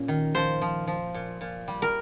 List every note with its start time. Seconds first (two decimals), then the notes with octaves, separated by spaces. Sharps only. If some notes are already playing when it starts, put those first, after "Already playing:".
Already playing: A#2 C#4
0.08 D#3
0.35 F3 C5
0.62 F3
0.88 F3
1.15 A#2
1.41 A#2
1.68 G3
1.82 A#4